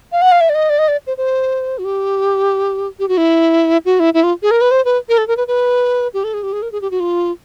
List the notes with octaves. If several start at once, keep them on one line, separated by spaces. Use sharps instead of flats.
F5
F#5
F5
E5
D5
D#5
D5
D#5
D5
C5
C5
F#4
G4
G4
F#4
E4
F#4
E4
E4
F4
G#4
A#4
B4
C5
B4
A#4
A4
A#4
B4
B4
G4
A4
G#4
G4
G#4
A#4
G#4
G4
F#4
F4